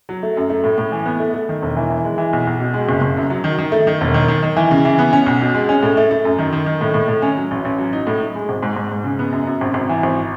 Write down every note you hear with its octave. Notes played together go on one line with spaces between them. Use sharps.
F#3
A3
F#2
A3
A2
A2
E3
B3
A3
A3
D#3
E1
E3
E3
G#3
E3
B1
B1
B2
G#3
F#1
F#1
F#2
F#3
D#3
D#3
A3
D#3
E1
D#3
D#3
D#3
E3
C#3
E3
B3
C#4
B1
B2
G#3
C#4
A2
A3
A3
F#2
D#3
D#3
D#3
A2
A2
A2
C#4
F#3
A1
A1
F#3
D#4
A2
D#4
G#3
G#1
G#2
G#2
G#2
C#3
B3
F#2
F#2
G#1
G#1
E3
G#1